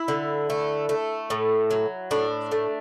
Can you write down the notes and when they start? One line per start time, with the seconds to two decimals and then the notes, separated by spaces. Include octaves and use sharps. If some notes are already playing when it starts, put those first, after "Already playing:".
Already playing: E4
0.08 D3
0.50 A3
0.89 A3
1.30 A2
1.71 F#3
2.11 A2 D4
2.52 A3